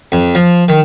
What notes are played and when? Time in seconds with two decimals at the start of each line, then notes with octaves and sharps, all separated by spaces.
0.12 F2
0.35 F3
0.68 D#3